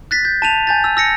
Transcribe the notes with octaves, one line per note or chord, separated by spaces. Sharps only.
F#6 A6 B6
G6
A5 D#7 F7
G#5 G6 A6
E6
E6 A#6 C#7